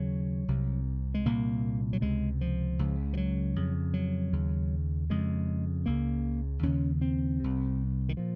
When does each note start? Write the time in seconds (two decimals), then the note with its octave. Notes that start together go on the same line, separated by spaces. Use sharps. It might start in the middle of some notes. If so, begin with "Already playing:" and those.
Already playing: D#2 C#3 F#3
0.48 C2 C3
1.14 G#3
1.26 C2 A#2 A#3
1.93 F#3
2.01 C#2 C3 G#3
2.41 F3
2.79 C#2 C#3
3.13 F3
3.17 F#3
3.56 F2 C#3
3.94 F#3
4.33 D#2 C#3
5.10 F2 C#3 G#3
5.86 C#2 C#3 A#3
6.63 D#2 C#3 C#4
7.01 C4
7.40 C2 C3
8.09 D#3
8.17 A#2 F3